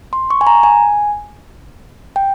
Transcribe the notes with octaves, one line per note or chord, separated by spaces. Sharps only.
C6
C#6
G#5
A#5
G#5
G5